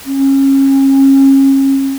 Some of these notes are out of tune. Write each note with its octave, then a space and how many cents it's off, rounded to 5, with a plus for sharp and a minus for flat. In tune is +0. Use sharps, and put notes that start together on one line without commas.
C#4 -30